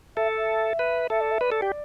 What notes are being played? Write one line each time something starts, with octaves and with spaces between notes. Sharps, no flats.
A4 E5
E5
B4
A4 E5
D5
E5
B4 D5
A4
G4